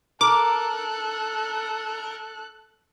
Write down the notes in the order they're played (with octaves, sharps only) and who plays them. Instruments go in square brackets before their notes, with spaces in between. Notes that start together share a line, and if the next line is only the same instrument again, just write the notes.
[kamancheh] A4 F#6 [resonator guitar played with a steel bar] A#4 [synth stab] D6